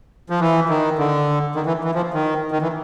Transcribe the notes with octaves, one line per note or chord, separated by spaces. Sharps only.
F3
E3
D#3
D3
D#3
E3
E3
F3
D#3
D#3
E3